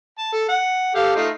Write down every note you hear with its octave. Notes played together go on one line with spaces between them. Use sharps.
A5
A4
F#5
G4 A4 F5
A3 D#4 F4